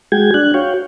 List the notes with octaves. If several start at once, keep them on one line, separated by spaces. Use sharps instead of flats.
G#3 F#4 G#4 G5 G#6
D4 F#6
F#4 C#5 F5 G5